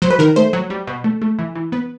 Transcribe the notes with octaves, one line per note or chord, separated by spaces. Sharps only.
F#3 C5
B4
D#3 A#4
A3 C5
F#3
G3
B2
A3
A3
E3
E3
B3 B4